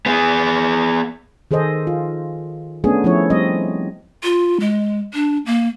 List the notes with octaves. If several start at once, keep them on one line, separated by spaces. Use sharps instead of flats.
B3 G#4
D#3 G#4 A4 C5 D#5
F4
A3 B3 C#4 D4 G#4
F3 A3 C#4 E4 C#5
G3 C4 D#5
F4
G#3
D4
A#3